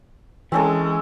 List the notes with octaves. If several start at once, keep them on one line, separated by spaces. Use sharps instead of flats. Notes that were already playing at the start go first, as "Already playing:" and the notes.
E3 G#3 C4 C#4 A4